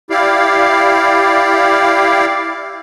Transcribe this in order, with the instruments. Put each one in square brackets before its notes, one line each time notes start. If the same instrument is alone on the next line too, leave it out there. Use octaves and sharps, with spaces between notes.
[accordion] E4 G4 D5 F5